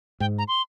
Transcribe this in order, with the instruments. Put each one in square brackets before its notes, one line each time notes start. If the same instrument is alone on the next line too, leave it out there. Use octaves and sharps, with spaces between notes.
[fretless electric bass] G#2 [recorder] G5
[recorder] A#5
C6